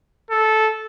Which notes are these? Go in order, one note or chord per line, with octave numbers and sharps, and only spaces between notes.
A4